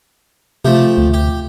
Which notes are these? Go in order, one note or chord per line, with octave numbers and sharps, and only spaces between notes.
C3 F3 A3 G4
D2
G4